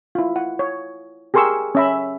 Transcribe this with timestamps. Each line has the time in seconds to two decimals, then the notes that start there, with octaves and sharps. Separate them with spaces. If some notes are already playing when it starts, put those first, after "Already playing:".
0.15 E4 F4
0.36 F#5
0.59 C#5
1.34 G4 G#4 A#4 C6 C#6 E6
1.75 C#4 E5 B5